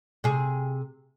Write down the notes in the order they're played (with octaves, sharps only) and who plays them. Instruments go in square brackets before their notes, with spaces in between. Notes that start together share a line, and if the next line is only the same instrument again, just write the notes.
[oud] C3 G#4